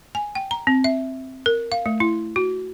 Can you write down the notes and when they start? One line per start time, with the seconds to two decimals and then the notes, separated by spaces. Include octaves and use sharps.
0.15 G#5
0.35 G5
0.51 A#5
0.67 C4
0.84 E5
1.46 A#4
1.72 F5
1.86 A3
2.00 E4
2.36 F#4